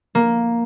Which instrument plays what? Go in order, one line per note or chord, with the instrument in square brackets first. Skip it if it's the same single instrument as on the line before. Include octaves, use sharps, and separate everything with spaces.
[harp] A#3